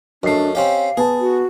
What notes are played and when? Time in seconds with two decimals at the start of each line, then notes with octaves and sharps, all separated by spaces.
0.23 F#2 A3 D4 D#5 C7
0.55 C4 C#4 G4 F5
0.97 B3 G#4 A5
1.20 F#4